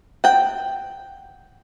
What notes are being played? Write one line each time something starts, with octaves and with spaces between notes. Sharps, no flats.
F#5 G5